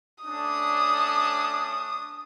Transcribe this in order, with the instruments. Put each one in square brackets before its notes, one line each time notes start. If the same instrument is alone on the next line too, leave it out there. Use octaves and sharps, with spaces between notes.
[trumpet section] A3 C#4 D4 [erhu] D#6